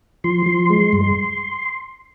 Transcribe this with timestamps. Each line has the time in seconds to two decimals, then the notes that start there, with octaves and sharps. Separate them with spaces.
0.24 F3 C6
0.46 F3
0.70 G#3
0.93 G2